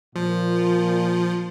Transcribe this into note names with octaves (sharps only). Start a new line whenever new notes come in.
A#2 F3